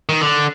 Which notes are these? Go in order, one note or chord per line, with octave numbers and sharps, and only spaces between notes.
D#3
D3